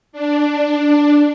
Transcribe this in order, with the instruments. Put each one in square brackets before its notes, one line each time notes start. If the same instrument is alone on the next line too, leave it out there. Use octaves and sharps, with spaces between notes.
[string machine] D4